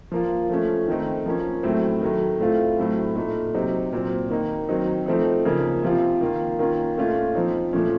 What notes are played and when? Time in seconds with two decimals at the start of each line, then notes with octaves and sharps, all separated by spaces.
0.11 F3 A#3 F4
0.49 F3 A3 C#4
0.88 D#3 A3 C4 D#4
1.26 F3 A#3 C#4
1.63 A2 F#3 A3 C4
2.01 D#3 F#3 A3
2.40 A2 A3 C4 F4
2.78 A2 F#3 A3 C4
3.16 A#2 A3 D#4
3.54 C3 F#3 C4 D#4
3.92 A#2 F#3 C4
4.30 D#3 A#3 D#4
4.69 D#3 F#3 C4 D#4
5.06 F3 A3 C4 D#4
5.45 C#3 F3 A#3 D#4
5.83 C3 F3 C4 F4
6.21 D#3 A#3 F4
6.59 D#3 A#3 C#4 F4
6.97 A#2 A3 C#4 F4
7.35 F3 C4 D#4
7.73 A#2 F3 A3 C#4